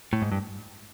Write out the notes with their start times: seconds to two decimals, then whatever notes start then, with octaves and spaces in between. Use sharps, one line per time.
0.13 A2
0.22 G#2
0.32 G2